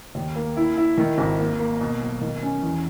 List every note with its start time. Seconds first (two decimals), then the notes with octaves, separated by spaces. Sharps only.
0.15 D#2
0.36 A#3
0.57 E4
0.77 E4
0.98 D#3
1.18 G#1
1.39 A#3
1.59 A#3
1.81 B2
2.01 B1
2.21 D#3
2.42 C#4
2.63 E2